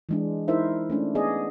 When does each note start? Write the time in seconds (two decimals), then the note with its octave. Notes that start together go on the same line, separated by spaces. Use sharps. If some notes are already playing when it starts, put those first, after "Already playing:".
0.09 E3 G#3 D4
0.48 D#4 E4 A#4 C5 E5
0.90 A3 C#4 D4
1.15 B3 G#4 D5 D#5